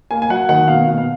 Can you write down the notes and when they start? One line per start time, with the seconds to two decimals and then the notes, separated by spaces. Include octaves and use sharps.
0.11 A#3 G#5
0.22 G#5
0.30 F#3 F#5
0.49 D#3 F#5
0.68 B2 F5
0.87 B2 F5
0.98 F5